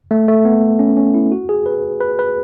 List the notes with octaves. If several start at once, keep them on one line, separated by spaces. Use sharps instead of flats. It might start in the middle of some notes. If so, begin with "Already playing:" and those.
A3
A3
B3
C#4
C#4
E4
F#4
G#4
B4
B4
B4